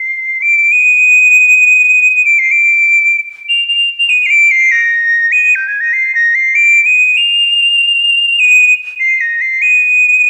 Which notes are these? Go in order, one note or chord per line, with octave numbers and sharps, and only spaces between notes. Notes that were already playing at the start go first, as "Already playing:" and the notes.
Already playing: C7
D7
D#7
D7
C7
D7
F7
F7
F7
D#7
C7
D7
C7
A#6
D#7
G6
G#6
A#6
C7
A#6
C7
D7
D#7
F7
D#7
C7
A#6
C7
D#7